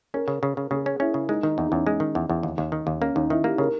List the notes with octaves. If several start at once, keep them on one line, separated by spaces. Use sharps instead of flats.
C#4 A#4
C#3
C#3
C#3
C#3 G#4
C#4
C#4 E4
C#3
G#3 D#4
D#3 D#4
E2 D#4
D#4
E2 C#4
G#3
D#3
E2
E2
D#2
D#2
D#3
D#2
A#3 C#4
D#2 D#4
D#3 E4
A#3 G4
C#3 A#4